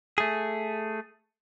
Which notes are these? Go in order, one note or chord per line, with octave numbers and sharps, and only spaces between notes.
A3 G#4